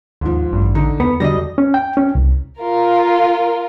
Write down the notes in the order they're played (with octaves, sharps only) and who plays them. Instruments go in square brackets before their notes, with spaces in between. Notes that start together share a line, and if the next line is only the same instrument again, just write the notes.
[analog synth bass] D#2 [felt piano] G#2 F3
[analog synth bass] A1 [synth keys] G2
[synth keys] D3 [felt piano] D#4
[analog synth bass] E2 [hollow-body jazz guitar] B3
[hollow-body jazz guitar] D3 G3 [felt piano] F#3 [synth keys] D#5 A#6
[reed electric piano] C#4
G5
C#4
C2
[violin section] F4 A#4